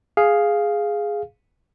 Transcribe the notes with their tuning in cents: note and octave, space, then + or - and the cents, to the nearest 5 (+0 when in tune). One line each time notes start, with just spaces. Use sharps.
G#4 +0 F5 +0